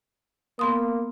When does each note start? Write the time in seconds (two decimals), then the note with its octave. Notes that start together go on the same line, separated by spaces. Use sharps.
0.59 A#3 B3 C6 D#6